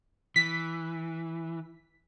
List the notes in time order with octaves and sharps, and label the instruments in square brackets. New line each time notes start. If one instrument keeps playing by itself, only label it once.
[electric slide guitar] E3 [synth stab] B6